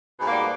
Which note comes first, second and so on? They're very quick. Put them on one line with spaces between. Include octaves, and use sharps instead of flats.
B2 G#2 A#3 G3